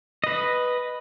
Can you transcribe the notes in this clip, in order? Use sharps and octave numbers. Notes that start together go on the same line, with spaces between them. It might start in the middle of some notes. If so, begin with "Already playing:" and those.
B4 D#5